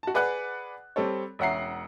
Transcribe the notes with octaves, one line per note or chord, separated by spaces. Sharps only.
F#4 A5
G#4 B4 D5 F#5 F#6
G3 C4 A4 C#5
E1 C#4 E5 F#5 A#5 C7